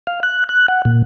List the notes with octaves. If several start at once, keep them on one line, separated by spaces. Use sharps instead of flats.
F5
F#6
F#6
F#5
A#2